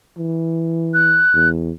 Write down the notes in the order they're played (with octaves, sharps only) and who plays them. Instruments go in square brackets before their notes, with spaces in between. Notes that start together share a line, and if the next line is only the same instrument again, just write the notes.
[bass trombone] E3
[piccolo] F#6
[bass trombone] E2